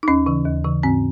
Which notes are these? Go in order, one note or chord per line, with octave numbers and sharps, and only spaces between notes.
D#4
D#2 C#4
C#3 E3
D#2
C#3 E3
G#2 C4